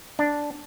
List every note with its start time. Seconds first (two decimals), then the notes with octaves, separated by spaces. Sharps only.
0.19 D4